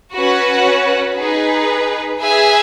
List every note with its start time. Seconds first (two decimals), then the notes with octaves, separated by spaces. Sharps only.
0.15 C#4 F#4 B4 F#5
1.17 D#4 G#4 B4
2.18 G#4 B4 E5 G#5